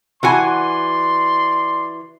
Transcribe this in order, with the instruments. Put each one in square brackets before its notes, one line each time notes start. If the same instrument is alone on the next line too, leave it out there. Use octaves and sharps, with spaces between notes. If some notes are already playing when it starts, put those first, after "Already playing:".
[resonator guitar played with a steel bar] E3 F#4 G#5 [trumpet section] D5 C6